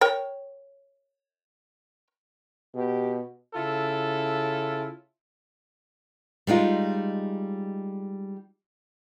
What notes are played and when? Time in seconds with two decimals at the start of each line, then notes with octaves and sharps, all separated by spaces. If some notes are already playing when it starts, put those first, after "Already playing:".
0.01 A#4 C#5 G5
2.75 B2 G4
3.54 C#3 E4 F4 A4
6.47 G3 G#3 D#4 F4